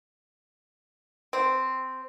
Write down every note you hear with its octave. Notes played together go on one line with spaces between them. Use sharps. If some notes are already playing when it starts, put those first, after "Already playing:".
C4